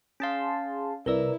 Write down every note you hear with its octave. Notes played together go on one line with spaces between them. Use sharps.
C#4 G#4 F5 A5 C6
C2 E4 A#4 B4 D5 A#5 E6